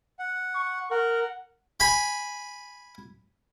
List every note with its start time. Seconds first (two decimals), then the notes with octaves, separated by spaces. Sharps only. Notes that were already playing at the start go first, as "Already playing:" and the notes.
0.19 F#5
0.55 C#6
0.91 A#4 F#5
1.80 G#5 B5